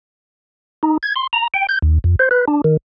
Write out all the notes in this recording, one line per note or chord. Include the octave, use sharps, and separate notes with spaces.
D#4
G#6
C6
A#5
G5
G6
D#2
F2
C5
B4
D4
D#3